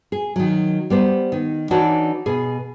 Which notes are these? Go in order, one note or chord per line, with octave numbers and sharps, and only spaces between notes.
G#4
D#3 F#3
G3 B3 C5
D#3
E3 D4 D#4 F#4 C#5 D5
B2 G#4